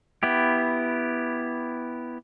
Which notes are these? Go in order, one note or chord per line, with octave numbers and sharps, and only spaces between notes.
B3 E4 G4